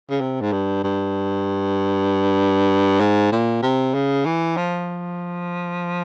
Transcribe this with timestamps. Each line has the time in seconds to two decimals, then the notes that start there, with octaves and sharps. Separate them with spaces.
0.10 C#3
0.21 C3
0.41 G#2
0.52 G2
0.84 G2
3.00 G#2
3.32 A#2
3.62 C3
3.94 C#3
4.26 E3
4.57 F3